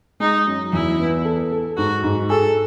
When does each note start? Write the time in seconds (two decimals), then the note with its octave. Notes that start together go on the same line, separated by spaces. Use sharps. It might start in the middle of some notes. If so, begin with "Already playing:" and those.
0.20 G#3 D#4
0.46 F#2
0.73 E2 E4
0.99 B3
1.25 A4
1.51 A4
1.77 G#2 F#4
2.04 G#2
2.30 G#4 A4